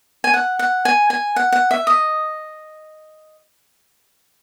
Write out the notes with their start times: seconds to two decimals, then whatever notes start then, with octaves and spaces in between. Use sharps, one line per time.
0.24 G#5
0.34 F#5
0.59 F#5
0.85 G#5
1.10 G#5
1.36 F#5
1.52 F#5
1.71 E5
1.87 D#5